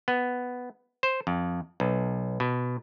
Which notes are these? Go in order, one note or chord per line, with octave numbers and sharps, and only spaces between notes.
B3
C5
F2
B1
B2